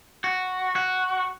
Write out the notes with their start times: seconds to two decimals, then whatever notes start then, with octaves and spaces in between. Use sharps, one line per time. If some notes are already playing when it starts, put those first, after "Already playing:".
0.24 F#4
0.76 F#4